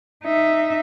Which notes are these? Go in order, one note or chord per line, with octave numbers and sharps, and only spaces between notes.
D#4 E5